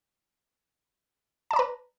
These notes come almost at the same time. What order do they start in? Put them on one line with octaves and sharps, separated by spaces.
A5 D5 A#5 B4